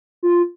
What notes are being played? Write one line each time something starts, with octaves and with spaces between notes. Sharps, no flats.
F4